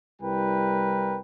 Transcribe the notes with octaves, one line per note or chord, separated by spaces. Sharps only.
C2 G3 E4 A#4 B4 G5